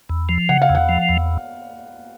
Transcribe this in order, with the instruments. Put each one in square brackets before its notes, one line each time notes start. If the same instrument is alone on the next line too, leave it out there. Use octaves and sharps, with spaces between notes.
[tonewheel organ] E2
F3
[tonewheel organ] C#3 [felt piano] F#5
[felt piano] F5
[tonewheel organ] E2
[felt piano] F#5
[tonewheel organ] F3
E2